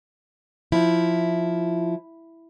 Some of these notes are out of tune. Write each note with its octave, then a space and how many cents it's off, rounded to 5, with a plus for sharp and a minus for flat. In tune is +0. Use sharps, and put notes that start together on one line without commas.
F3 +0 E4 +0